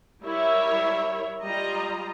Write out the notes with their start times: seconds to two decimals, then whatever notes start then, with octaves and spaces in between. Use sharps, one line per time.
0.25 G3 E4 A#4 C#5 E5
1.45 G3 F4 D#5 A#5